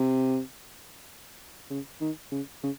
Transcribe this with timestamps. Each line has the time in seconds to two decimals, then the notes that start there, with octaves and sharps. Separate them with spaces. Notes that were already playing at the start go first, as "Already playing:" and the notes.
Already playing: C3
1.70 C#3
2.01 D#3
2.32 C#3
2.63 C#3